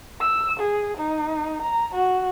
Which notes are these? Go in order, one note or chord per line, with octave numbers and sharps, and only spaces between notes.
E6
G#4
D#4
A#5
F#4